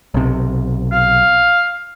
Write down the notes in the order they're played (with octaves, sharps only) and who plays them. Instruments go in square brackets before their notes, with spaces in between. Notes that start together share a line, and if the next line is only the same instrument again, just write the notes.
[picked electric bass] B1 C3
[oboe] F5